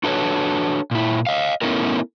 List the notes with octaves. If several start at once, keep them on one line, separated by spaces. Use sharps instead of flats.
D4 F#4 A4 B4 C#5
A#2 E4
D#5 F5
A3 B3 C#4 D#4 E4 A#4